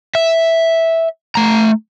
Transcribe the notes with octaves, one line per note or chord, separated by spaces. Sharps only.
E5
A3 A#5